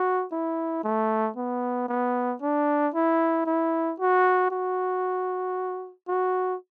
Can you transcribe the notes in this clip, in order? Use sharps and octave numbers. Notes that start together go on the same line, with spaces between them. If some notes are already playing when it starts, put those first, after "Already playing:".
Already playing: F#4
E4
A3
B3
B3
D4
E4
E4
F#4
F#4
F#4